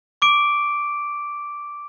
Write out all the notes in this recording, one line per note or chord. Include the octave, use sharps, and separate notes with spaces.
C#6 D6 D7